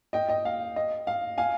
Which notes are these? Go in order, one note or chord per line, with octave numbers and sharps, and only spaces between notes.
D#5 G5
D#5 G5
F5
D#5
F5
F5 G#5